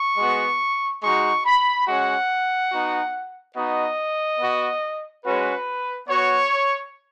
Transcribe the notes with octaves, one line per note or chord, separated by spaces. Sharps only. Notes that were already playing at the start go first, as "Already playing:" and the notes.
Already playing: C#6
G#3 B3 F#4
G#3 D#4 F#4 C#6
B5
G#3 C#4 F#4 F#5
B3 D#4 F#4
B3 D#4 F#4 D#5
B3 F#4
G#3 C#4 F#4 B4
B3 F#4 C#5